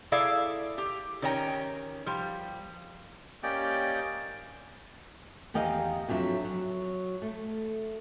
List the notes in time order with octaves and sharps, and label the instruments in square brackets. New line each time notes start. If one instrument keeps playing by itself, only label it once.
[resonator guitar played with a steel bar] E4 G#4 A4 D5 E5 F5
G4
D#3 C#4 C#5 G5 A#5
F3 G3
[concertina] A#3 C#4 G4 D5 D#5 G5
[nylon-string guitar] E2 D#3 G4 D#5 F5
F2 F#3 D4 E5
F#3
A3